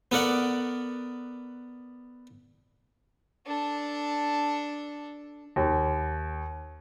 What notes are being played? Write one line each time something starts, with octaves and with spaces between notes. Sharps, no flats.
B3 A4 A#4 D5 F#5
D4 A4
D#2